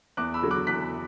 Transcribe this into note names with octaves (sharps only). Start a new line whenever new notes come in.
E2 D6 F#6
B5 E6
D3 F#3
D6 F#6
E2 F#6 B6